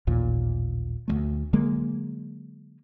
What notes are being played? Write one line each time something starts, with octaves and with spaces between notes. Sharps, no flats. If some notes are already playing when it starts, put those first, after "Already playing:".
A1 D#2 A#2
D2 G3 A3
D3 F#3 G#3 A#3